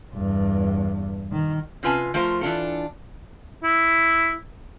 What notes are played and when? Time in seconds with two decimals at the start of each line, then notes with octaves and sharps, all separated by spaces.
0.14 E2 G2
1.32 D#3
1.83 C3 C#4 F4 B4 G#5 A5
2.14 F3 A3 F4 A#4 C5
2.41 E3 D4 F4 A4
3.64 E4